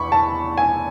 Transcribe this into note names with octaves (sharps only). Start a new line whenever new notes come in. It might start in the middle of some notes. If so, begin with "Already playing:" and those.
Already playing: E2 B5 C#6
A5
G#5